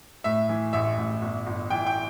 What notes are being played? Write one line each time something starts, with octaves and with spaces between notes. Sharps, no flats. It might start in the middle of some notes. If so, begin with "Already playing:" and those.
A2 E5
E3
A1 E5
A1
G1
G1
E3 G5
G5